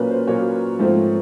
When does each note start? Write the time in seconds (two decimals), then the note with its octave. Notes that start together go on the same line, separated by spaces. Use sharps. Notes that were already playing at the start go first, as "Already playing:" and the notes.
Already playing: A#2 F#3 A#3 C#4 A#4 B4
0.10 C5
0.27 A#2 F#3 A#3 C#4 C#5
0.79 G#2 F3 A3 C4